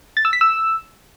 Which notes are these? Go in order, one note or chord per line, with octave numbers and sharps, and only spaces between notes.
A6
E6
B6
E6